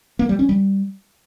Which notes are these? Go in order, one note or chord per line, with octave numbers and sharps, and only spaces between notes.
A#3
G3
C#4
G3